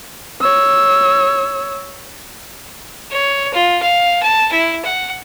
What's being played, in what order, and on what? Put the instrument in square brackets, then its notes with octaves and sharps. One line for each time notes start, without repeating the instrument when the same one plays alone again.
[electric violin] C#5 E6
[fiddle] C#5
F4
F5
A5
E4
F#5